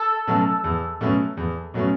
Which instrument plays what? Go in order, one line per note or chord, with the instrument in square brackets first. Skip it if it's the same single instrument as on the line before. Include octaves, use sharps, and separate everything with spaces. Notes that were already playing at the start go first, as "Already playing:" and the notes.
Already playing: [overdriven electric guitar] A4
[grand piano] B2 F#3 A3 C#4
E2
B2 F#3 A3 C#4
E2
B2 F#3 A3 C#4